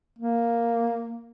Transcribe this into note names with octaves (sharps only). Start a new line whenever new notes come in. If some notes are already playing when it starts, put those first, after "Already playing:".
A#3